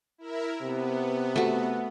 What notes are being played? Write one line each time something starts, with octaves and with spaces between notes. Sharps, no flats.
E4 A#4 E5
C3 B3
A3 F#4